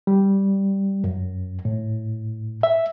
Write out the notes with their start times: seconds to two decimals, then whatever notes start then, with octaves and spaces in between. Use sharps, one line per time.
0.07 G3
1.04 F#2
1.65 A2
2.63 E5